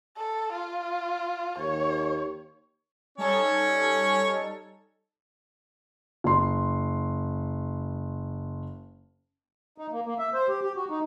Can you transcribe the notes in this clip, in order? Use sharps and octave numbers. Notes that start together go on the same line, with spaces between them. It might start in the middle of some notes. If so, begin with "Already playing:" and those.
A4
F4
D#2 C#5
G3 C#4 D#4 A4 C#5
F#1 C6
D#4
A#3
A#3
E5
C5
G4
G4
F#4
D#4